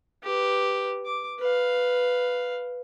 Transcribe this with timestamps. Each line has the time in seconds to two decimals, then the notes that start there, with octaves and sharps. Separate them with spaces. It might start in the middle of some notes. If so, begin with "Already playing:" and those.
0.24 G4 B4
1.05 D6
1.40 B4 F5